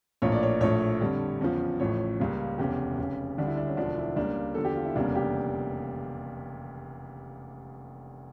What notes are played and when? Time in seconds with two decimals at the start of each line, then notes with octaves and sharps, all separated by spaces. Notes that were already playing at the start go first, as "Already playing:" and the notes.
0.22 A#1 A2 F3 A#3 C#5
0.32 D5
0.43 C#5
0.60 A#1 A2 F3 A3 C#5
1.00 F2 D3 G3
1.41 E2 C#3 F3
1.80 A1 A2 F3 C#5
2.19 C#2 C#3 G3 A#3
2.58 F1 E2 C#3 G4
2.98 F1 F2 C#3
3.38 D2 D3 G3 D4
3.47 E4
3.57 D4
3.67 C#4
3.77 E1 D2 D3 F3 D4
3.97 E4
4.16 C#2 C#3 G3 A#3 D4
4.55 E2 D3 F3 A4
4.65 G4
4.76 F4
4.85 E4
4.96 F1 E2 C#3 G3 A#3 D4
5.15 G4